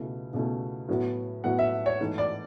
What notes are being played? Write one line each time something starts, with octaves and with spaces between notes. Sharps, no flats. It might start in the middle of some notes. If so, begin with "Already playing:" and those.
Already playing: C#2 B2 A3 E4
C#2 B2 A3 E4
A2 F#3 B3 E4
A2 F#3 B3 E4 F#5
E5
C#5
G#2 E3 A3 E4
D5